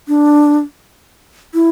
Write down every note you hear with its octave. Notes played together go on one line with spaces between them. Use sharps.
D4
E4